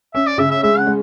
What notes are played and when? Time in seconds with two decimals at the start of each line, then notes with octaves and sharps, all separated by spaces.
0.14 C#4 E5
0.27 D5
0.38 C#3 E5
0.51 E5
0.63 G#3 E5
0.78 F#5
0.87 G#3